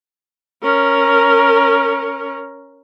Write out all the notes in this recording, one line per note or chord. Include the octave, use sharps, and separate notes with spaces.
C#4 A#4